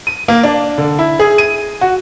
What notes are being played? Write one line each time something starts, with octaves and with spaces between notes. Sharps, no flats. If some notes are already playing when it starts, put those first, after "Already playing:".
D#7
A#3
D4
D3
E4
G#4
D#7
F#4